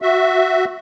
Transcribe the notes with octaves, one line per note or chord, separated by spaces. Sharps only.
F#4 E5